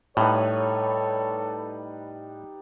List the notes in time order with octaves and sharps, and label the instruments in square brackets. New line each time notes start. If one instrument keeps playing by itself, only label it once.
[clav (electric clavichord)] A2 [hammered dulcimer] G3 D#4 B4 [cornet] A4 [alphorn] C#5